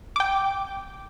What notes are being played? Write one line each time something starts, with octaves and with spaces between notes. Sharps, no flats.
G5 D6